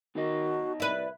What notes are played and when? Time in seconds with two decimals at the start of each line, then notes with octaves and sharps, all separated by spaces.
0.15 D#3 B3 D#4 F#4 D#5
0.80 C2 E4 B4 D5